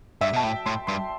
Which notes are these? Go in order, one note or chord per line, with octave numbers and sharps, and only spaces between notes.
G2 E5
B2 A5
A2 G5
A2 C6
G2 C6